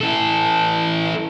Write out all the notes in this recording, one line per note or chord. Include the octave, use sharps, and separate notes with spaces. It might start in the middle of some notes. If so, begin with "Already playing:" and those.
E3 A4